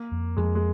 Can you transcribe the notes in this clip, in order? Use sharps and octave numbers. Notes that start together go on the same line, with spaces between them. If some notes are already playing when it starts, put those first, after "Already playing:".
Already playing: A#3
F2
F2 G#3
G#3